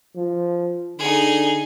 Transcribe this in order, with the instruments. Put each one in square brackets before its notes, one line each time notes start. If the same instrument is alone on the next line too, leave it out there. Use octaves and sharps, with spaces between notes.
[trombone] F3
[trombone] D3 [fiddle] D#4 G#4